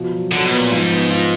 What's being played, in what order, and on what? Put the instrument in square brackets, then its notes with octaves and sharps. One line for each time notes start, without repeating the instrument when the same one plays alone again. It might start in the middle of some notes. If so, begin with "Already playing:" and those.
Already playing: [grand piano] B2 F3
F#3
[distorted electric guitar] D3 [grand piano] F#3
[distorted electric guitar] B2
[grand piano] B3
[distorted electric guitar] A#2
[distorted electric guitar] G#2 [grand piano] F3
[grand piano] B3
F4